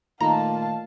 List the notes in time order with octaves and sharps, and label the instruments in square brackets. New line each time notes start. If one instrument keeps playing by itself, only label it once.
[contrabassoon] A#2 [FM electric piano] D#3 A3 D#4 [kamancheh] F5 A5 [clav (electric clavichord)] A#5